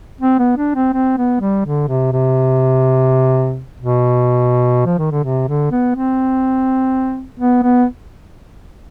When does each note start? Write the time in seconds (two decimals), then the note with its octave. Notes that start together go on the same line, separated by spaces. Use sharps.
0.21 C4
0.39 B3
0.57 D4
0.75 C4
0.93 C4
1.17 B3
1.41 G3
1.65 D3
1.88 C3
2.12 C3
3.80 B2
4.86 F3
4.98 D#3
5.11 D3
5.24 C3
5.48 D3
5.71 B3
5.95 C4
7.39 B3
7.63 B3